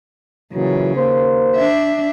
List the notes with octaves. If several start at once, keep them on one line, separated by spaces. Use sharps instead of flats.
A#2 C#3 E3 F#3
D#2 A#3 C5
D4 E5